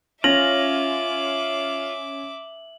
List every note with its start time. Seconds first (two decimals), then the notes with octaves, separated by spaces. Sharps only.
0.24 C#4 F4 E5 D6 A#6 F#7